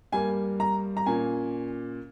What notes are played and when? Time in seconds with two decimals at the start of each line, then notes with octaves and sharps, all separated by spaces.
0.12 G2 G3 A#3 G#5
0.60 A#5
0.97 A#5
1.06 A#2 A#3 C#4 G#5